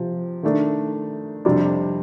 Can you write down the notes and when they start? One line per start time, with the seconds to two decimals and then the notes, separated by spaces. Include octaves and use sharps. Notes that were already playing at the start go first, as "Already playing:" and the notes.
Already playing: C3 F3
0.43 D#3 A3 D4
1.45 F2 C3 G3 D4